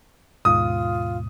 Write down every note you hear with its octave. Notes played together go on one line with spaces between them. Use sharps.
D#2 G#2 B2 F4 D#6